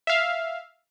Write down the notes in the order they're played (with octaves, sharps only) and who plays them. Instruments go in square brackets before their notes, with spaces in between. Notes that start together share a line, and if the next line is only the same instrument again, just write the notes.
[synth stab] E5 F5